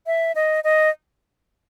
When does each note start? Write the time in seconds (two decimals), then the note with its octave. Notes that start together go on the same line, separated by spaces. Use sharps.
0.07 E5
0.35 D#5
0.64 D#5